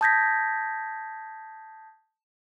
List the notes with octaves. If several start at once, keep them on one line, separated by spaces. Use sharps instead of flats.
A5 D#6 G6 G#6 A#6 B6